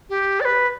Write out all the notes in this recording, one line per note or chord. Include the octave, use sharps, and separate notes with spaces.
G4
D5
B4